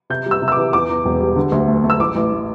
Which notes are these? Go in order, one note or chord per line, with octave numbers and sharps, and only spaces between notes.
C3 G6
G3
E6
C3
E6
D6
E3
E2 D6
E2
E1
G3
D3
D2
A3
A3
E6
A1 D6
A1
A2